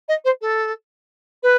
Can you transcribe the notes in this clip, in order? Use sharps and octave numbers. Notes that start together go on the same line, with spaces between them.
D#5
C5
A4
B4